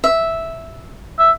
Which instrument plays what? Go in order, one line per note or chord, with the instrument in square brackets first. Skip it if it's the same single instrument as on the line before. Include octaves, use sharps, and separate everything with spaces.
[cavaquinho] E5
[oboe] E5